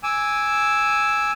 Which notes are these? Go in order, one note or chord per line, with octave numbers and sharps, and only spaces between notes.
G#5 D6 E6